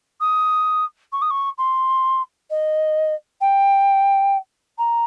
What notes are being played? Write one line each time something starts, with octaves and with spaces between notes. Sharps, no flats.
D#6
C#6
D#6
C#6
C6
D#5
G5
A#5